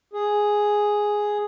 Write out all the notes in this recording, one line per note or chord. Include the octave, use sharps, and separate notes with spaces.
G#4